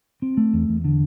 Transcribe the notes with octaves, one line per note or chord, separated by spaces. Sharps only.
C4
A3
E2
E2
D3